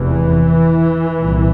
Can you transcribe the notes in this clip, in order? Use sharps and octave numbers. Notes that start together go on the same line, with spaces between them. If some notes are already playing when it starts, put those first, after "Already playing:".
Already playing: F1 E2 C3 E3
C2 A#2